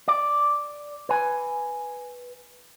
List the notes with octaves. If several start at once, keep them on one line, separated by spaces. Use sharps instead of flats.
D5
B4 G#5